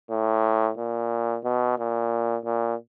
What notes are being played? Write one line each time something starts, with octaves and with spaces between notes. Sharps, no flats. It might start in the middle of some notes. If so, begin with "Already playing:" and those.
A2
A#2
B2
A#2
A#2